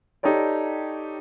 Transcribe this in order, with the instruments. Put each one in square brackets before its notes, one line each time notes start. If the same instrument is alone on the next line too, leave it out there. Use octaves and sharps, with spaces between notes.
[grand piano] D#4 G4 A4 C#5 D5